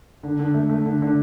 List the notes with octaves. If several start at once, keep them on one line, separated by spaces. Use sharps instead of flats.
D3
D3
A3
A3
D3
D3